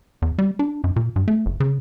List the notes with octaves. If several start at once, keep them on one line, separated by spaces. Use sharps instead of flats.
E2
G3
D4
F#2
A#2
G2
A3
F#1
C#3